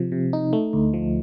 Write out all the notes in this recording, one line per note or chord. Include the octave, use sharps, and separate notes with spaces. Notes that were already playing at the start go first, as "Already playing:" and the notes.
Already playing: C3 F3
C3
D#4
A3
D2
F3